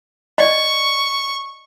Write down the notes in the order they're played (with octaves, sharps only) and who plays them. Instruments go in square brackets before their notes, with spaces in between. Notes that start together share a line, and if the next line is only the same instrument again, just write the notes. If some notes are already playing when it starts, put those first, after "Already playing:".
[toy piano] D5 D#5 [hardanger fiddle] C#6